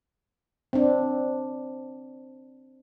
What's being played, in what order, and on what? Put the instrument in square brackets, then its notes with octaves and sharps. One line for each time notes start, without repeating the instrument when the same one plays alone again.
[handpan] C4 D4